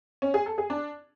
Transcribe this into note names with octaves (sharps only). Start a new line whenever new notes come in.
C#4
G#4
A4
G#4
D4